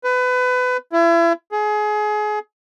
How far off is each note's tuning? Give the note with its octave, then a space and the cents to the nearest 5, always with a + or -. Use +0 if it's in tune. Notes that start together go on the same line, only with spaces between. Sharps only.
B4 +25
E4 +35
G#4 +25